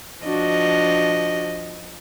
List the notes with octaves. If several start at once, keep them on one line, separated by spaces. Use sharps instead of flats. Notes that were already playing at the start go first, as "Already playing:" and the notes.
F3 D4 F#4 D#5